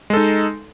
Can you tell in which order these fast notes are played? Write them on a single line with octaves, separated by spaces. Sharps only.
G#3 A4 D#4